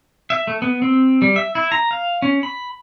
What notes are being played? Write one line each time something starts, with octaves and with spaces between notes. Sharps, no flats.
E5
A3
B3
C4
G3
E5
E4
A#5
F5
C#4
B5